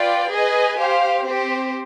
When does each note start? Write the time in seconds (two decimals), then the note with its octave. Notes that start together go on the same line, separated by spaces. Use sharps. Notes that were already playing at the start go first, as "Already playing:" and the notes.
Already playing: F4 B4 D5 G5
0.32 G#4 B4 D#5 G#5
0.79 G4 C5 F5
1.25 C4 G4 C5